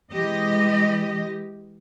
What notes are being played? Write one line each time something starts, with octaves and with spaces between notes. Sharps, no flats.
E3 G#3 G4 D#5